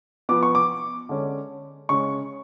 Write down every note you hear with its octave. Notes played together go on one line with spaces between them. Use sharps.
F3 B3 D6
C#6
D6
D3 G#3 C#4
C#3 G#3 C#4 C#6